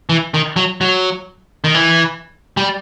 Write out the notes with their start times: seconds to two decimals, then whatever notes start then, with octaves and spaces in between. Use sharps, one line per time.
0.10 E3
0.34 D#3
0.56 F#3
0.81 F#3
1.64 D#3
1.74 E3
2.57 G3